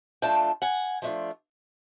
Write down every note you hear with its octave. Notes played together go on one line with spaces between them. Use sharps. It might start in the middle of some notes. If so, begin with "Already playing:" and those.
F3 A3 D4 F4 G5 A5
F#5 G#5
F3 A3 D4 F4